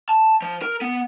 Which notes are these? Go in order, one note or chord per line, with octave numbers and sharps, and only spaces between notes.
A5
F3
A#4
B3